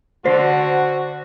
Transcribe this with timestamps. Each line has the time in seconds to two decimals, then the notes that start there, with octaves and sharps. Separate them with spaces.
0.25 D3 F#4 C5